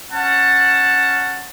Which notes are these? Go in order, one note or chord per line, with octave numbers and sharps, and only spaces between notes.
C#4 F#5 A5